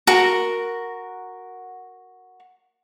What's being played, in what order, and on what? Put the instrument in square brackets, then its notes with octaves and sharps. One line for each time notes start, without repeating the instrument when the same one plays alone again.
[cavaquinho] F#4 A#4